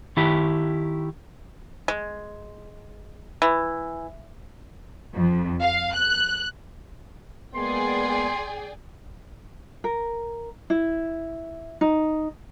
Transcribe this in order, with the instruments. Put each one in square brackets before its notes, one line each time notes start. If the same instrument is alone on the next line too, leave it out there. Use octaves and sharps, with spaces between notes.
[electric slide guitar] D#3 E4 G4
[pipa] G#3
E3
[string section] F2
F5
F#6
[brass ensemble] G#3 A#3 B3 [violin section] G#4 D5 G5 [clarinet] C6
[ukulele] A#4
E4
D#4